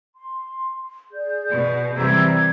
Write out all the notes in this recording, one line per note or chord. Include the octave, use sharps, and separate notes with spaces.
C6
G#4 D5 G6
B2
C3 E3 G3 A#5 E6 G#6